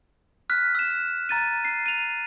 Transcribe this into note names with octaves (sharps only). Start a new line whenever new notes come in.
F6 F#6 B6
E6 E7
A#5 A6 D#7
C7
D#7 F7